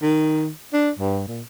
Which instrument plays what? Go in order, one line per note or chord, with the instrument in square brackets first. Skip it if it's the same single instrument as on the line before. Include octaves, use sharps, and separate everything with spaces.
[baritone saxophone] D#3
D4
G2
A#2